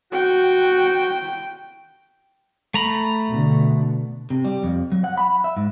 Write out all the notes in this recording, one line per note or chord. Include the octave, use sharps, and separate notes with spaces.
F#4 G5
A3 A#5 B5
B2 D3
C3
G3
F2
F#3
F#5
B5
E5
G#2